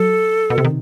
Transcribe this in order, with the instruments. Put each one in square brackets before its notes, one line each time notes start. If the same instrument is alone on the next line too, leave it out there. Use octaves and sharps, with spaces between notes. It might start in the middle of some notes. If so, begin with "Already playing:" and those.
Already playing: [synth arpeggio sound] F#3 [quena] A4
[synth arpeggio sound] B2
C3
D#3